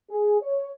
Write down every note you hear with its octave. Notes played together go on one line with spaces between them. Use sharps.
G#4
C#5